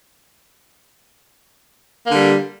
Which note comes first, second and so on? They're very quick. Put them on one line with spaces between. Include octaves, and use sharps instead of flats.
A#3 D3 G3